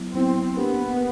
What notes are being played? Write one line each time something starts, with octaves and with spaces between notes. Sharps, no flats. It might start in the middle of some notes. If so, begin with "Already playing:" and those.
Already playing: F#3 B3 E4
F#3 B3 C4 E4
A#3 B3 D4 G4 A#4